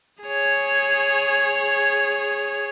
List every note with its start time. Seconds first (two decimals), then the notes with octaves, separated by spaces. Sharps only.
0.23 G#4 C#5